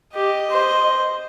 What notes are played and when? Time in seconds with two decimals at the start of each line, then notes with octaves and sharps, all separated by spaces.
0.14 G4 D#5
0.50 C5